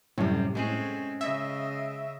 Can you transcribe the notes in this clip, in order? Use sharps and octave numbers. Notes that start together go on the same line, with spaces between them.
F#2 A2 C3 G3
G#3 A3 C4 C#4 G#4
C#3 D#5 E5